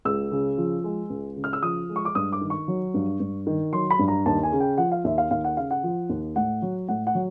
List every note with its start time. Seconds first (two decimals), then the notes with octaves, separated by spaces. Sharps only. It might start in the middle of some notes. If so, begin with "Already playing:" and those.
0.05 C#2 E6
0.31 C#3
0.58 F3
0.84 G#3
1.10 C#2
1.36 C#3
1.44 F6
1.53 E6
1.63 F3 D#6
1.89 G#3
1.96 C#6
2.05 D6
2.15 G2 D#6
2.32 D6
2.41 D#3
2.50 C#6
2.68 F#3
2.94 G2
3.20 G2
3.47 D#3
3.73 F#3 C6
3.91 B5
3.99 G2
4.08 A#5
4.26 D#2 A5
4.43 G#5
4.52 C#3
4.60 G5
4.78 F3 F#5
4.92 F5
5.04 D#2 E5
5.18 F5
5.31 D#2 F5
5.44 F#5
5.57 C#3 F5
5.71 F#5
5.84 F3
6.09 D#2
6.36 A2 F#5
6.62 F#3
6.88 A2 F#5
7.07 F#5
7.15 F#3